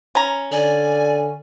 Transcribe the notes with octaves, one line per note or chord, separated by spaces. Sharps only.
C#4 A#5
D3 D5 G#5